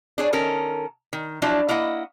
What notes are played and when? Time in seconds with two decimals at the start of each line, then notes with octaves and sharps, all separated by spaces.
0.18 D4 G#4 C#5
0.33 D#3 C#4 A4 A#4
1.13 D#3
1.42 F3 F#3 D4 E4
1.68 A#3 E4 D#5 F#5